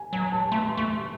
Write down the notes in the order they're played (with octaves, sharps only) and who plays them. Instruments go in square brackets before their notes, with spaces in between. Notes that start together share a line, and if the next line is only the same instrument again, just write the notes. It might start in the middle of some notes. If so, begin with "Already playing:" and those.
Already playing: [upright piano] G#5
[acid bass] F#3 [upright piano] G#5
[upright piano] A5
[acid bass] A3 [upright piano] C6
[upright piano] C6
[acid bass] A3 [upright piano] C#6